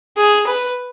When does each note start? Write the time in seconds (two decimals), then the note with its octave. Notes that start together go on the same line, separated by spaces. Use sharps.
0.17 G#4
0.47 B4